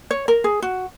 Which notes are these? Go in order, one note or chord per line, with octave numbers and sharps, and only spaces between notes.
C#5
A#4
G#4
F#4